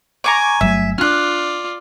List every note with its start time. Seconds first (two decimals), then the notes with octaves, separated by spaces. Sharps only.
0.24 G#5 A#5 C#6 D6
0.61 G1 F#3 A3 E5
0.98 C#4 D4 F4 D5 F6 F#6